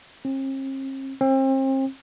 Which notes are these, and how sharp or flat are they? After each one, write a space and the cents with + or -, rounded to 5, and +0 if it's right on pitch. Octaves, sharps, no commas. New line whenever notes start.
C4 +45
C4 +35